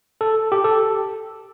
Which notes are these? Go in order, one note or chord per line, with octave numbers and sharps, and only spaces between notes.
A4
G4
A4